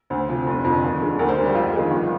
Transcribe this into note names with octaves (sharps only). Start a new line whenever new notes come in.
D2 C5
C3 F3
F1
F2 D3
D#2
D3 G#3
D2 A#4
C5
D3 G3
G4
F2 F4
D#3 G#3
G1